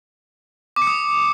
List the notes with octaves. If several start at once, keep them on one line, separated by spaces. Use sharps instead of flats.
D6
C#7
D#6